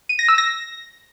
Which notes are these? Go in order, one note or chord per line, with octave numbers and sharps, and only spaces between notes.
D#7
A#6
E6
A#6